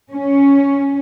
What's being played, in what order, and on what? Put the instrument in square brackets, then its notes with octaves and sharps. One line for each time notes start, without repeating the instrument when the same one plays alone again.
[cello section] C#4